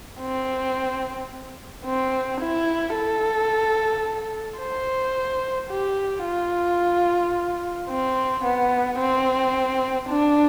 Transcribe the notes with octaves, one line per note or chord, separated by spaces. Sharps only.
C4
C4
E4
A4
C5
G4
F4
C4
B3
C4
D4